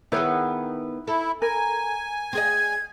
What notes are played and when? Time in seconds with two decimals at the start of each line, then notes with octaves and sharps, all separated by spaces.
0.12 D#3 B3 E4 G#4 B4 C#5
1.07 E4 A4
1.42 A#4 G#5
2.33 C4 G#4 D#5 G#6